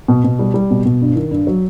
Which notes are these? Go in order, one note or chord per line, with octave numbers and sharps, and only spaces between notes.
B2
B2
G3
G3
B2
B2
G2
D#3
G2
F#3